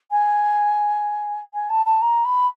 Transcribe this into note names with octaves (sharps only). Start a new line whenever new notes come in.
G#5
G#5
A5
A5
A#5
B5